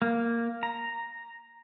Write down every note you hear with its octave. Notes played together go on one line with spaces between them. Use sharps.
A#3
A#5